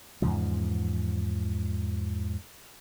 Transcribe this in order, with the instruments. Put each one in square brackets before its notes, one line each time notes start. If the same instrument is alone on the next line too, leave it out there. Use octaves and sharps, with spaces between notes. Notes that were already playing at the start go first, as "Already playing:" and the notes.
[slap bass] E2 G#2 C#3 F3